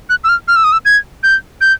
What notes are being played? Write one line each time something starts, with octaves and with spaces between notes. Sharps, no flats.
F#6
E6
F6
F6
E6
D#6
E6
G#6
G6
G6